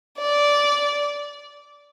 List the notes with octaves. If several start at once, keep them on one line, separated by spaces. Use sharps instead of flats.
D5